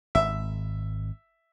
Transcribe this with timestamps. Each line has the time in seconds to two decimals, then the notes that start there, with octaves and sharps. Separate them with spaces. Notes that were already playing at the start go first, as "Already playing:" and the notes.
0.15 G#1 E5